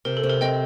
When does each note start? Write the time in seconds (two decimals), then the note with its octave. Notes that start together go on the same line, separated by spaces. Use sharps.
0.05 C3 A#4
0.17 A4
0.23 C3
0.29 A#4
0.41 C4 D#5 G5